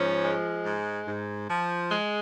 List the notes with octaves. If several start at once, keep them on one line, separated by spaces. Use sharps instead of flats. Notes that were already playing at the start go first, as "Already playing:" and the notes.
Already playing: G#2 F3 C#4
G#3
G#2
G#2
F3
G#3